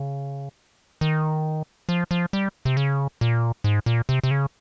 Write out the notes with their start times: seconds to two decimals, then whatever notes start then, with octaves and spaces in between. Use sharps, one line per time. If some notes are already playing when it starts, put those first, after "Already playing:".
Already playing: C#3
1.01 D#3
1.89 F3
2.11 F3
2.33 G3
2.65 C3
2.77 C#3
3.21 A#2
3.64 G#2
3.86 A#2
4.09 C3
4.24 C3
4.31 C#3